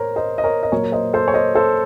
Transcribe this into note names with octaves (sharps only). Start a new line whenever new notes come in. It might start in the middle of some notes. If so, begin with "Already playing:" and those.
Already playing: A2 A#4 C5 C#5
C5 D#5
D#5
A#4 C#5
D#5
A#2 F#3 A#3 A#4 C#5
C5 D#5
A4 C5
C#5
C5 D#5
A4 C5